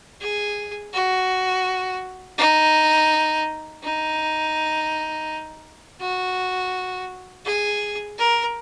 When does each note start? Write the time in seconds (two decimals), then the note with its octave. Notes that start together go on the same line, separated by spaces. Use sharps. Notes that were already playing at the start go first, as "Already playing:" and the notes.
0.21 G#4
0.94 F#4
2.38 D#4
3.83 D#4
6.01 F#4
7.45 G#4
8.18 A#4